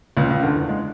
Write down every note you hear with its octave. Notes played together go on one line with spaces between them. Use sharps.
C#2 C#3
C#2 C#3
D2 D3
E2 E3
G#3